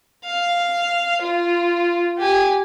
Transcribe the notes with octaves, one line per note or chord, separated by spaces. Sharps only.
F5
F4
G4 G#5